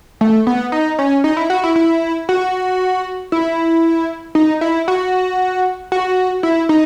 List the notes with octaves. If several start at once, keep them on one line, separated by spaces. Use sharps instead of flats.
A3
B3
D#4
C#4
D#4
E4
F#4
E4
E4
F#4
E4
D#4
E4
F#4
F#4
E4
D#4